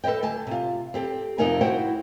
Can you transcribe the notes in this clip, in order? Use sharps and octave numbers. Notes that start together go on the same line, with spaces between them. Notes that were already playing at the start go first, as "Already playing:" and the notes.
A4 B4 C#5 D#5 G5
D2 G#5 A5
C3 F4
C4 G4 A4
F2 C3 D#4 F4 A#4 G#5
E4 F#4 C5 F#5 G5